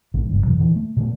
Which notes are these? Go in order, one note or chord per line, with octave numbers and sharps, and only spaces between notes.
A#1 G#2 D3
G1 C#2 G2
F2 B2 E3 F#3
A#2 D3 E3
A3
A#2 D3 A3